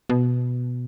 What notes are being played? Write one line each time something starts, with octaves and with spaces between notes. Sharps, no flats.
B2